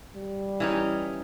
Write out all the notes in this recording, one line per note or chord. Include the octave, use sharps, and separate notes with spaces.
G3
E3 C#4 D#4